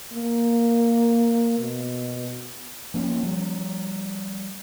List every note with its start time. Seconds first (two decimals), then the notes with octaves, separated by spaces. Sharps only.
0.13 A#3
1.59 B2
2.94 F3 A#3 B3 C#4
3.23 F3 G3